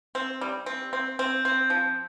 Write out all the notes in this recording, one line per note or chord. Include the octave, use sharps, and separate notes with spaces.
C4
G3
C4
C4
C4
C4
F3